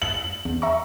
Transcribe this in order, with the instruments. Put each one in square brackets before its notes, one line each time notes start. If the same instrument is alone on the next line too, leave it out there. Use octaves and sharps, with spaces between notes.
[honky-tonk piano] F#7
[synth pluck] E2
E5 A#5 C#6